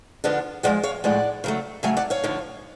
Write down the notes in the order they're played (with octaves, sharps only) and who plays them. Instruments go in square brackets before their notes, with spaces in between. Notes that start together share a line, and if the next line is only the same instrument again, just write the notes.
[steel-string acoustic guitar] F2 D3 F3 B3 D4
A2 F3 G#3 D5 F#5
C#5 F5
A2 F3 G#3 D5 F#5
C#3 F#3 A3
C#3 F#3 A3 F5 G#5
D5 F#5
C#5 F5
F#2 D3 F3